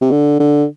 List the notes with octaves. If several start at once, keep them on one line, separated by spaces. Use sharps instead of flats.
C3
D3
D3